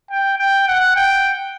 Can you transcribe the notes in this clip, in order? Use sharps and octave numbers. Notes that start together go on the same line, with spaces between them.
G5
G5
F#5
G5